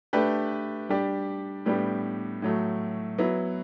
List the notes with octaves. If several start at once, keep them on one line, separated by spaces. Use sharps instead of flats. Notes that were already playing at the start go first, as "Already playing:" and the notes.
A3 D4 G4 B4
G3 D4 G4
A2 G3 B3 D4 G4
A2 F#3 A3
F#3 B3 E4